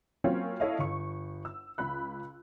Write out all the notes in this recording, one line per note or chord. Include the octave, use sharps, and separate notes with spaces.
F#3 A#3 C4 C#4 F4 C#5
E4 A4 C#5 D#5 F5
G1 C#6
E6
C#2 B5 F#6